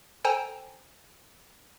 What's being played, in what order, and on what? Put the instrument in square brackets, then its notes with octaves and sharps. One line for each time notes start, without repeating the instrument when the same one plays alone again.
[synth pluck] A4 C5 G5 G#5 A#5